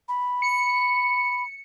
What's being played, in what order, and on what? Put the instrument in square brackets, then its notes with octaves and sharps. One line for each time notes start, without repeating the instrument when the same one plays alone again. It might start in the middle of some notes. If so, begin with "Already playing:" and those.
[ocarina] B5
[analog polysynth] C#7